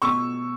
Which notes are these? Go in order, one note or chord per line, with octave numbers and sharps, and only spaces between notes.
B2 C#6 E6